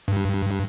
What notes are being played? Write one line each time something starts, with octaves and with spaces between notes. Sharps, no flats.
G2